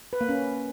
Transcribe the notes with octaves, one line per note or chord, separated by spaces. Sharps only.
B4
A#3
C#4